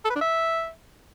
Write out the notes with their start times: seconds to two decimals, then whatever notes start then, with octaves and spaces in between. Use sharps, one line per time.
0.05 A4
0.10 B4
0.16 D4
0.21 E5